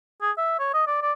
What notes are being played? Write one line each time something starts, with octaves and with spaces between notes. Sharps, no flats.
G#4
E5
C#5
D#5
D5
D5